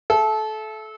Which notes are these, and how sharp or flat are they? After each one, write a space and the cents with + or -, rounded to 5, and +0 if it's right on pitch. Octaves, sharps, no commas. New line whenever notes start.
A4 -25 E5 +20